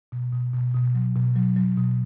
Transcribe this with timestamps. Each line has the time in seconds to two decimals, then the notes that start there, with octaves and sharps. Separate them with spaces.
0.12 B2
0.33 B2
0.54 B2
0.75 B2
0.95 F#3
1.16 B2
1.36 F#3
1.57 F#3
1.77 B2